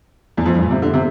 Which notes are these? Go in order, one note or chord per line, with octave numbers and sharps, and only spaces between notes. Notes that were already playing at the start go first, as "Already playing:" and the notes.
E2
F2
G2
A#2
C3
D3
C3